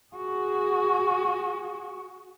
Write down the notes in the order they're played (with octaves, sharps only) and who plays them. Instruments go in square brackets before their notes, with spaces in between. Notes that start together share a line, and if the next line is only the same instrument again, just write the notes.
[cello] F#4 G#4